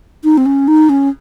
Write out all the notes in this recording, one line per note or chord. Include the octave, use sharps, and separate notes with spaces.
D#4
C4
C#4
D#4
C#4